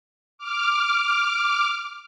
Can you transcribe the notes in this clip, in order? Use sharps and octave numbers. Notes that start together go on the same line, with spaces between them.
D6 F6